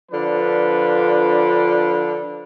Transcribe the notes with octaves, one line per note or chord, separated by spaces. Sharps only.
D3 F3 D4 F4 B4